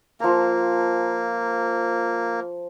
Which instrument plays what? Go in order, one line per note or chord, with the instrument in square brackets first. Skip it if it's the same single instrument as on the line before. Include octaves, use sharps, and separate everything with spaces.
[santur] F3 A#5 [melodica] A#3